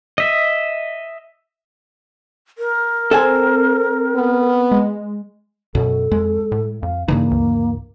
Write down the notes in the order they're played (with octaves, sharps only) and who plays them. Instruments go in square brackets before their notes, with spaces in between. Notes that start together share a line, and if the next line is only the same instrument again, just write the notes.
[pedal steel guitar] D#5 E5
[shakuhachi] A#4
[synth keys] C4 [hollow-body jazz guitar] A4 C5 G#5
[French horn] B3
[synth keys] G#3
[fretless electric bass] F#2 B2 [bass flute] A4
[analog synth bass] F2 [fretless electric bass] G#3
[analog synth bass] A2
[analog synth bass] F2 [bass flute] F5
[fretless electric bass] G2 C#3 E3 [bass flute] A#3 [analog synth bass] D#4
[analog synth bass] D2